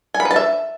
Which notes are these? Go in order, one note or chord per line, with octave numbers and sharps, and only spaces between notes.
G#5
B5
B4
A5
E5